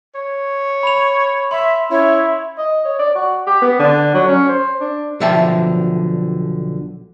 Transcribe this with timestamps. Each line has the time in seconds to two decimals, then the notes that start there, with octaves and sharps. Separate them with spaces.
0.15 C#5
0.83 B5 F7
1.51 E5 C6
1.91 C#4 E4 C#5
2.58 D#5
2.85 C#5
2.99 D5
3.15 F#4
3.47 G4
3.62 B3
3.79 D3
4.14 F#3
4.28 C#4
4.49 C5
4.81 D4
5.20 B1 D3 F3 E5 G5 A5